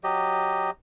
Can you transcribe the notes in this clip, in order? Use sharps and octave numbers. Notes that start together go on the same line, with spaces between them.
F#3 G4 D#5